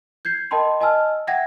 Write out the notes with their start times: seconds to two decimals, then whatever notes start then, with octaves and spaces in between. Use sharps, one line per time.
0.25 G6 G#6 C7
0.51 A#4 D#5 G5 A5 B5 C6
0.81 D#5 G#5 A5 E6 F6
1.27 E5 F#5 G5 G#6 A#6